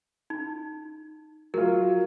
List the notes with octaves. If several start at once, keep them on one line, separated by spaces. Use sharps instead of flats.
D#4
F#3 F4 A#4